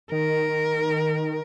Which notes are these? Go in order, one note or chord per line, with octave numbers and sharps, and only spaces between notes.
D#3 A#4